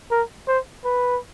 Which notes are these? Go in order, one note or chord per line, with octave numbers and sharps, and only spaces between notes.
A#4
C5
B4